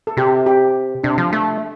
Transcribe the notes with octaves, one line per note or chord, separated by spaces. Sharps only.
A4
C3 G4
G4
C3 D4
F3
A3